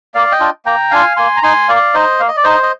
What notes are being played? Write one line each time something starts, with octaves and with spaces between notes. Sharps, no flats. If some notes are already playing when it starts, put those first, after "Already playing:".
A#3 D5 F5
D#5 G5
D4 F4
A#3 G5 A#5
D4 F4 F5 G#5
A#3 G#5 C6
A#5
D#4 G#5 C6
A#3 D5 F5
D#4 C5 D#5
A#3 F5
D#5
D5
D#4 C5 D#5
D#5